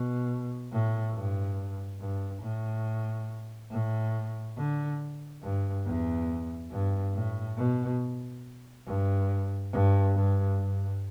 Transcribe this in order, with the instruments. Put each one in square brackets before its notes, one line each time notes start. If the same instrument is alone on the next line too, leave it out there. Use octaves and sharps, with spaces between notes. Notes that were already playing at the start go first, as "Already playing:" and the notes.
Already playing: [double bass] B2
A2
G2
G2
A2
A2
D3
G2
E2
G2
A2
B2
G2
G2
G2
G2